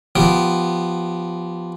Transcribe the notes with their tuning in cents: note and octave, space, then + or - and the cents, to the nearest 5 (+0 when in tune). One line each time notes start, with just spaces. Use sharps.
F3 +0 B3 +0 G4 -15